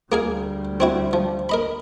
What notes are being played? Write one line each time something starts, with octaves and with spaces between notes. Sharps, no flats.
D2 G3 A#3 G#4 F5
C4 E4 F#4
F3
A#4 D#5 B5